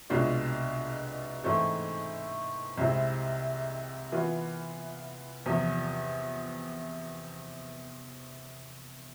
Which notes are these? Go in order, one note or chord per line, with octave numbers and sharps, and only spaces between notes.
C2 B2 G#3 D4 F4
G#2 E3 A3 C4
C2 C3 G#3 C4 E4
E3 B3 F4
E2 C3 F3